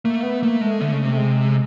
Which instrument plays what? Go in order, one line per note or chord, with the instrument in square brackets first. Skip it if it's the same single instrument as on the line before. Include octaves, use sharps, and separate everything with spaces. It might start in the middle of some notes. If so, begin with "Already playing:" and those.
[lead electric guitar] A3 [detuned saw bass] A#3
[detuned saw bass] B3
[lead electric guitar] A3 [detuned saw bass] A#3
[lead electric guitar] G#3 [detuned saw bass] A3
[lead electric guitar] D3
C#3
[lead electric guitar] C3 [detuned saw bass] A3
[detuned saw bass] G#3